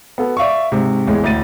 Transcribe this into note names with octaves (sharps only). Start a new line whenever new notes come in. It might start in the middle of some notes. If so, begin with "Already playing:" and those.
B3 F#4 A4
D5 E5 F5 C#6
G#2 C3
A1 E2 A2 G#3
A1 D2 A2 A6 D#7